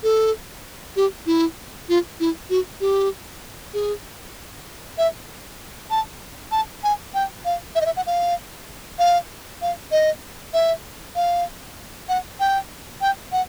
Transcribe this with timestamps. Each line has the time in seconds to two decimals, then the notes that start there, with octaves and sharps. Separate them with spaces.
0.03 A4
0.96 G4
1.26 E4
1.89 F4
2.20 E4
2.50 F#4
2.81 G4
3.74 G#4
4.98 E5
5.91 A5
6.52 A5
6.84 G#5
7.14 G5
7.45 F5
7.75 E5
7.81 D#5
7.86 E5
7.97 F#5
8.07 F5
8.99 F5
9.62 F5
9.92 D#5
10.54 E5
11.16 F5
12.09 F#5
12.40 G5
13.01 G5
13.32 F#5